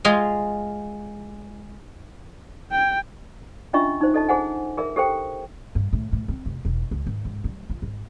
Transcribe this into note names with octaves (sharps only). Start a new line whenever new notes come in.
G#3 F4 G#4
G5
C#4 D4 F4 D#5 E5 C#6
D#4 C5
A4 D#5 A5
G#4 C5 F#5 G#5
G#4 A#4 E5
G4 A4 C5 G5
G2
A2
A2
C4
F1
E1
C#2
G#1
G#2
G3
F4
G#1